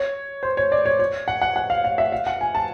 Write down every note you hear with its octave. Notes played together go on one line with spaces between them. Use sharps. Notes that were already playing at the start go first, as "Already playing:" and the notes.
Already playing: C#5
C5
C#5
D5
C#5
C#5
F#5
F#5
F#5
F5
F5
E5
F5
F#5
G#5
A5